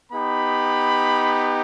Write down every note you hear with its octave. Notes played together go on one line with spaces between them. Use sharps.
B3 D#4 G4 B5